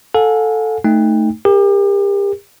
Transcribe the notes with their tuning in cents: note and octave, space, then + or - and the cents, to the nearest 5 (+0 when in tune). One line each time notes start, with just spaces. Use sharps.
A4 +0 F5 +45 G#5 +0
A3 +0 D#4 +0 G5 +30
G4 +35 A#4 +0